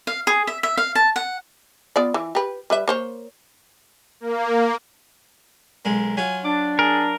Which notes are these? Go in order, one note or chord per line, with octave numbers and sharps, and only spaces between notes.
F5
G#4
E5
E5
F5
A5
F#5
B3 F4 D5
E3
G4 B4
G3 B4 E5
A#3 C5 C#5
A#3
B1 G#3 A#4
F#3 F4 G#5
D4 D6
G#4 A#4